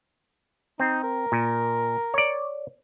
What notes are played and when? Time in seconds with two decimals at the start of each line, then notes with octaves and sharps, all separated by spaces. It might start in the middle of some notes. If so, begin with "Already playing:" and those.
0.80 C4 D#4
1.03 A#4
1.32 A#2
2.14 C#5 D5